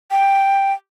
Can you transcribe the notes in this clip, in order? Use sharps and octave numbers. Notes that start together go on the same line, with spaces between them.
G5